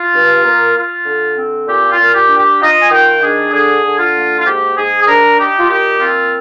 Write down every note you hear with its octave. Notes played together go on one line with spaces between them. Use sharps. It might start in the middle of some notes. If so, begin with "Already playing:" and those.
Already playing: F4
G2
A#3
F4
D3
C4
A#2 G4
F4
A#2
G4
D4
G4
F4 D#5
G#5
D#3 G5
D4 G#4
D3 G#4
D3
F4
A#3
F4
G#2 G4
G#2 G#4
G#4
D4 A#4
D#4 G4
F4
A#2 G4
C4 F4